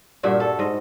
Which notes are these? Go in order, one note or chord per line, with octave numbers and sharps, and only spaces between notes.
G2 A#2 F#4 E5
A4
G#2 D#5